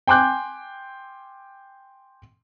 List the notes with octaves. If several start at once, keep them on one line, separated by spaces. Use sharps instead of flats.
G5 G#5 C6 D6 F#6 G6